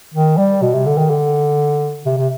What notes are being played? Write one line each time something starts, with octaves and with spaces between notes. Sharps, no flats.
D#3
G3
B2
C3
D3
D#3
D3
C3
C3